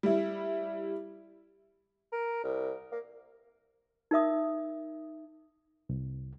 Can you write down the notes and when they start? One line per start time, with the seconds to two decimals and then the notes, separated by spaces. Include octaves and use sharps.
0.03 G3 E4
2.12 A#4
2.43 C2
2.92 A#3
4.11 D#4 A#4 E5 D#6
5.89 C2